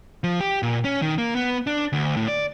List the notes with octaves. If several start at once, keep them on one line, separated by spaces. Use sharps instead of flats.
F3
G4
A#2
C#4
D#3
A#3
B3
D4
D2
A2
D5